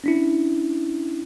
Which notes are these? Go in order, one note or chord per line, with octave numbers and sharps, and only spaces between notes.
C#4 D4 E4